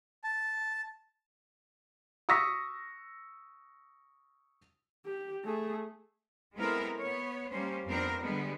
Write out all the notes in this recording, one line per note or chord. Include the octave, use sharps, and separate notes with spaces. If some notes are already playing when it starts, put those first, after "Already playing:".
A5
C#6 D#6 E6 A#6 B6
G4
A3 G#4
G#3 B3 C4 E4 A4 A#4
B3 C#5
G3 A#3 C#4 C5
F2 B3 C4 D4 A#4
D3 G3 G#3 B3